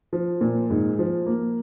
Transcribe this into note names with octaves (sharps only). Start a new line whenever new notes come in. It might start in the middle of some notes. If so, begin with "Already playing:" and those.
F3
A#2
G#2
F3
A#3